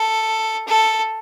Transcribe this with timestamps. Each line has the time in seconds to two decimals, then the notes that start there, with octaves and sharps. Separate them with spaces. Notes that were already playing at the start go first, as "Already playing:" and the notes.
Already playing: A4
0.68 A4